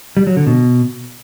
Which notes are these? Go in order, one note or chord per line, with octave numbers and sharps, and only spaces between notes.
G3
F#3
D3
B2